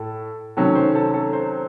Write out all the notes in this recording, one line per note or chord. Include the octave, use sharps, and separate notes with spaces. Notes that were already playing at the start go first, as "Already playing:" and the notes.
Already playing: A2 A4
C3 D#3 F#3 A3 C#4 A4
C5
A4
A4
C5